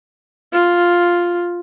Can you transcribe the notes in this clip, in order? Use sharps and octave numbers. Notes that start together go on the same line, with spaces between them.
F4